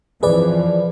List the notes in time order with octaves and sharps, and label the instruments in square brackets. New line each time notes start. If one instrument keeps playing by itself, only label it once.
[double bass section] F2 E3 F3 [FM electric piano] G#4 B4 D5